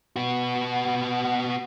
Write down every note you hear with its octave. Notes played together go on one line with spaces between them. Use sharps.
B3 F#4